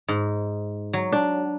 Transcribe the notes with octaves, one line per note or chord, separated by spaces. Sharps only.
G#2
F#3
D4